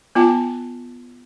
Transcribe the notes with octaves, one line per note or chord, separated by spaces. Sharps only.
B3 F4 G5 A5